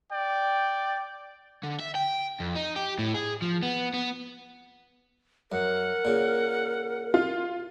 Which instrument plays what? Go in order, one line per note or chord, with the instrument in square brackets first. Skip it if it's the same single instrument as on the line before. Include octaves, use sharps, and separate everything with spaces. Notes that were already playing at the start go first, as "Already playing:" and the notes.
[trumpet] D5 [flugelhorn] G5
[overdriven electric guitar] D3
E5
G5
F2
D#4
G4
A2
G#4
F3
B3
B3
[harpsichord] F#2 [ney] A#4 [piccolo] F#5
[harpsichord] A#2 C#3
[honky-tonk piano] F4